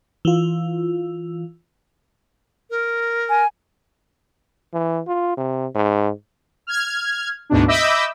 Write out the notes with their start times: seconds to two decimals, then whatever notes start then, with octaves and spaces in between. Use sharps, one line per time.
0.25 E3 F4
2.70 A#4
3.29 G#5
4.73 E3
5.07 F4
5.37 C3
5.75 G#2
6.67 F6 G#6
7.50 D2 G#2 B2 D4
7.68 D#5 E5 B5 D6 E6 G6